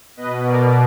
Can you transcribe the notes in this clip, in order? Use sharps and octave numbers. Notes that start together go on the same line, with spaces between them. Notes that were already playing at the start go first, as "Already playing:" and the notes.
B2 B4 D#5
B2 A#4 D5